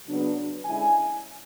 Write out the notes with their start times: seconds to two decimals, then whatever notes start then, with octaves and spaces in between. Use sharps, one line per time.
0.08 C#3 F#3 B3 D4
0.65 D3 G#3 C#4 E4 G#5